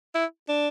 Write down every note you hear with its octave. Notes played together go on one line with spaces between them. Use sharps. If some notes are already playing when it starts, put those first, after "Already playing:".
E4
D4